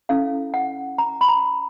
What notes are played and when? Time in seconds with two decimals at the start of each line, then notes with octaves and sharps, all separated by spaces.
0.09 C#4 E4 A4 F5
0.54 F#5
0.98 A#5
1.21 B5
1.29 A#5